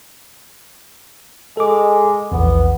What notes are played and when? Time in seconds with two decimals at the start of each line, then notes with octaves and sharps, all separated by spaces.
1.57 G#3 A4 D6
2.32 A#1 E2 B3